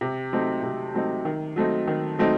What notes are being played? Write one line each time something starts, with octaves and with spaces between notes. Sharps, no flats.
C3
F#3 A3 C4 D#4
C3
F#3 A3 C4 D#4
D#3
F#3 A3 C4 D#4
D#3
F#3 A3 C4 D#4